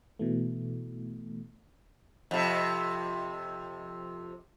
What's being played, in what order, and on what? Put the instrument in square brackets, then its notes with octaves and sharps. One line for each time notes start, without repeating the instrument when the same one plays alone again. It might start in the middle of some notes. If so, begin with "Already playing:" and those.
[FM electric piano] B2 E3 A3
[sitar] F2 C3